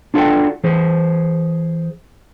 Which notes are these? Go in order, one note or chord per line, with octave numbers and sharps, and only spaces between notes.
D4 F4 F#4 A4 D5 G5
E3 G#4 C5